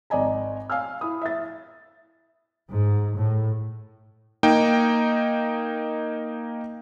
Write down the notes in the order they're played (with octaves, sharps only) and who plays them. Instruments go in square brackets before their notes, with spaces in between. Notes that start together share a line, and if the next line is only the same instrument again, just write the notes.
[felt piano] G#1 D5 D#5 G#5 A#5
F5 G#5 E6 F6
E4 D#6
E5 A6
[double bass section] G#2
A2
[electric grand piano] A#3 D#4 G5